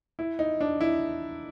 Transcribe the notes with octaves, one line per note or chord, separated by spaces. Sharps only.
E4
D#4
D4
E4